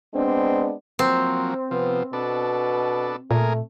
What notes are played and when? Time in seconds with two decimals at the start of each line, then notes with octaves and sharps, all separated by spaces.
0.14 G#3 B3 C4 D4
0.99 F3 F#3 A#3 C4
1.71 C3 F3 B3
2.13 B2 B3 D4 A4
3.31 A#2 A3 A#3 G#4 A#4